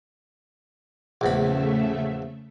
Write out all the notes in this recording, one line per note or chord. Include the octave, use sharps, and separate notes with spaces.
A#1 E2 C#3 A3 E5 B5